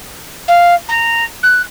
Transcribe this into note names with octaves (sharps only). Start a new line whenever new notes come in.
F5
A#5
F#6